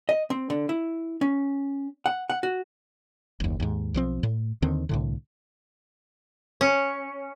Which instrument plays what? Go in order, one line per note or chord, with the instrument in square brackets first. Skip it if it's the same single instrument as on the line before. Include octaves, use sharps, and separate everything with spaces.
[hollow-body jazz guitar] D#5
C4
D3
E4
C#4
F#5
F#5
F#4
[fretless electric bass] F#1 D#2
D#2 G#2
B1 F3 C4
A2
D#2 D3 D#3 C4
C2 A2 D3
[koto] C#4